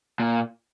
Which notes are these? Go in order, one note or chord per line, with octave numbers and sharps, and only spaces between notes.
A#2